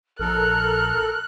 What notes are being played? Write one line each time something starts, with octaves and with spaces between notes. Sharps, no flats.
A#1 A4 A#4 F6 F#6